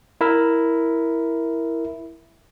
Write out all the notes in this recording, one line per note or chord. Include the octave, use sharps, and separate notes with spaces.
E4 A#4 E5